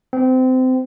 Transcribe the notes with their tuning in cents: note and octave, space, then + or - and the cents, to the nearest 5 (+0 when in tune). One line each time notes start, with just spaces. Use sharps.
C4 -25